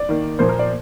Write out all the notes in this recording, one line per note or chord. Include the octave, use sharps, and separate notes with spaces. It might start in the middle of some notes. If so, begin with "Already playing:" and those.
Already playing: D5
D#3 A#3
A#2 F3 A#3 C5
A#4
D5